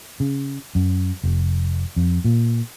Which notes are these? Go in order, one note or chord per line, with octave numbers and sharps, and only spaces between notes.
C#3
F#2
F1
F2
A#2